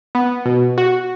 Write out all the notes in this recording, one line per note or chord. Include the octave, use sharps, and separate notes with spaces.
B3
B2
F#4